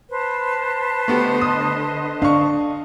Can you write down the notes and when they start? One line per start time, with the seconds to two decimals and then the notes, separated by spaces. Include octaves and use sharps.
0.10 B4 C5 A5
1.08 D3 A3 B3 G4 D#5
1.41 D#6
2.22 D4 F5 C#6